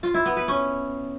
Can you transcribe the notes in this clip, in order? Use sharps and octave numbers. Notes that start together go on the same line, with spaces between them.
F4
E4
B3
B4
C#4